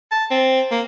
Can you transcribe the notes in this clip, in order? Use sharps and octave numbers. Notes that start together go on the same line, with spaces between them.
A5
C4
A#3